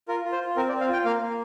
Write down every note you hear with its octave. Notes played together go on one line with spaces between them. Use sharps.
F4 A#4
F4
C5
F4
C4 A#4
D5
C4
F5
F4 G5
A#3 F5
A#3